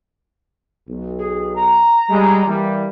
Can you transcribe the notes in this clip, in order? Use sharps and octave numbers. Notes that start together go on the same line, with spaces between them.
B1
G#4
A#5
G3 G#3
E3 G3 A#3